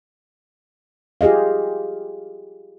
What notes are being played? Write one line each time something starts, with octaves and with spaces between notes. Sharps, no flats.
F4 G4 G#4 D#5 F5